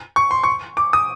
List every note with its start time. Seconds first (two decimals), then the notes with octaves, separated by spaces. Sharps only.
0.16 C#6
0.31 C6
0.44 C#6
0.77 D6
0.93 D#6